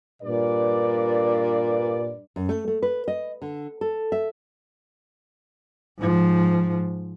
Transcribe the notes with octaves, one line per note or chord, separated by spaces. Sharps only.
G2 A#2 B4 D5
F#2
A3
A3
B4
D#5
D3
A4
E5
G#2 F3